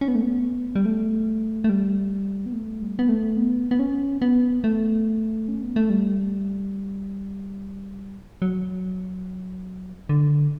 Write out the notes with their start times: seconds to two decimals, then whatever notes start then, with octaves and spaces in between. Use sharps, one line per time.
0.01 C#4
0.08 B3
0.15 A3
0.22 B3
0.76 G3
0.86 A3
1.64 A3
1.69 G3
2.46 B3
2.53 A3
2.82 G3
2.99 B3
3.09 A3
3.37 B3
3.71 B3
3.79 C#4
4.22 B3
4.64 A3
5.48 C#4
5.62 B3
5.76 A3
5.90 G3
8.42 F#3
10.09 D3